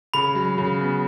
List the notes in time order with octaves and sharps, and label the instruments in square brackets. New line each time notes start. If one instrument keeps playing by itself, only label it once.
[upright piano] C#3 [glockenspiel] B5
[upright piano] F#3
C#3
B3